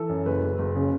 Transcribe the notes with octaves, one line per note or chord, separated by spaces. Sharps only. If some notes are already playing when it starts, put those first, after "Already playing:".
Already playing: E3 A4
F#2
F#1 B4
F#1
F#1
C#3